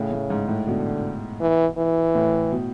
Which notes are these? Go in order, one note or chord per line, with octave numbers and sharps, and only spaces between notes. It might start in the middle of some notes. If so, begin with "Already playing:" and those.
Already playing: A2 C#3
A2
G#2
A2
B2 D3
E3
E3
A2
B2